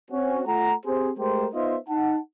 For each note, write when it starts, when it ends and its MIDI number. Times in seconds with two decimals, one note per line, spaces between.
0.11 0.41 60
0.11 0.41 61
0.11 0.41 66
0.47 0.73 57
0.47 0.73 65
0.47 0.73 78
0.47 0.73 82
0.86 1.11 60
0.86 1.11 67
0.86 1.11 68
0.86 1.11 72
1.19 1.48 56
1.19 1.48 57
1.19 1.48 67
1.19 1.48 70
1.19 1.48 72
1.54 1.77 59
1.54 1.77 63
1.54 1.77 65
1.54 1.77 72
1.54 1.77 75
1.54 1.77 76
1.89 2.18 63
1.89 2.18 78
1.89 2.18 81